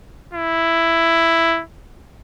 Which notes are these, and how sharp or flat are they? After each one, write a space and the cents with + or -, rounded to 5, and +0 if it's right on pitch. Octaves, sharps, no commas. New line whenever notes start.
E4 +5